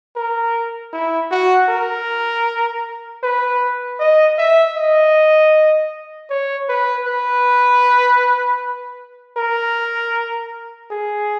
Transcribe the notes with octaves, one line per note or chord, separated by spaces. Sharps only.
A#4
E4
F#4
A#4
B4
D#5
E5
D#5
C#5
B4
B4
A#4
G#4